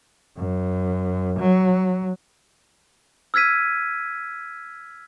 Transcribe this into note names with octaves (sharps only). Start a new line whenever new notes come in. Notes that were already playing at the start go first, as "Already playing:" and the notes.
F#2
F#3
E6 F6 G#6 B6 D#7